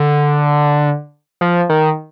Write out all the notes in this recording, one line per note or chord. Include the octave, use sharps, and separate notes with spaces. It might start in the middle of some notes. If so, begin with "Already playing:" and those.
Already playing: D3
F3
D#3